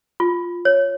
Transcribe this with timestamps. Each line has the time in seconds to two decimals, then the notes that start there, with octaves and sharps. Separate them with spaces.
0.20 F4
0.65 C#5